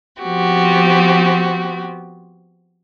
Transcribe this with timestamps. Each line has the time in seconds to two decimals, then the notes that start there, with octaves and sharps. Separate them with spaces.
0.22 F3 B3 C4 F#4 G4